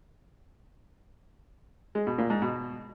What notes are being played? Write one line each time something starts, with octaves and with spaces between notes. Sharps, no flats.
G#3
B2
A#2
G#2
B2